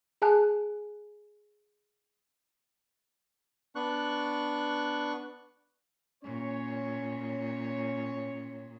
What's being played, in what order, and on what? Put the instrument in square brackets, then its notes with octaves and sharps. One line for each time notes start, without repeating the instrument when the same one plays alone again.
[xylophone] G#4 G#5 A5 F#6
[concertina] B3 D4 C#6 F#6
[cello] A#2 [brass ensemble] C#4 C#5